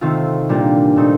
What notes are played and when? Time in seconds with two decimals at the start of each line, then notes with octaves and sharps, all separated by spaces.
0.01 C3 D#3 A3 C4 F4
0.49 A#2 G3 A#3 D4 F4
0.96 A#2 A3 C4 D#4